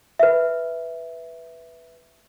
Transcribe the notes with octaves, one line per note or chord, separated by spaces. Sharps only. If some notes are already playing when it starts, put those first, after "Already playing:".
B4 E5